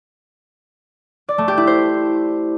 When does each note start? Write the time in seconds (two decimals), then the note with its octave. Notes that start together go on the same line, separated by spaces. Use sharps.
1.29 D5
1.38 A3
1.48 G4
1.58 E4
1.67 C5